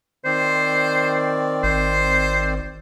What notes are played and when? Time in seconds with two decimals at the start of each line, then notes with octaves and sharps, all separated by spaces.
0.25 D#3 C4 C5 D5
1.64 G#1 C5